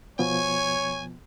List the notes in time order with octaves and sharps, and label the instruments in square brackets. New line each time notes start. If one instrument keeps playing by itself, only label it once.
[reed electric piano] B2 F3 B3 [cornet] C#5 [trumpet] G#5